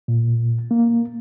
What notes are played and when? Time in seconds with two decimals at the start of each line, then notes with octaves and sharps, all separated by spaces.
0.08 A#2
0.71 A#3